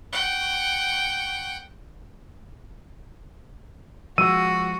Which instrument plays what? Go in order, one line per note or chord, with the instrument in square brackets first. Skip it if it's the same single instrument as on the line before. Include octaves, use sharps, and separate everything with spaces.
[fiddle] F#5 G5
[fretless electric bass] F3 G#3 [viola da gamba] F#4 [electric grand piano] E6 D#7